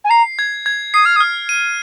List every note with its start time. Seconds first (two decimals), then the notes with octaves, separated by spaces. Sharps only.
0.04 G#5
0.10 A#5 C7
0.39 G#6
0.66 G#6
0.94 D#6 C7
1.05 F6
1.16 D#6
1.20 F6
1.49 D#7